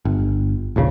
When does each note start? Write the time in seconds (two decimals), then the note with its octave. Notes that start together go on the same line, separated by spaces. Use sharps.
0.05 G1
0.76 D#1 A#1 A2 C#3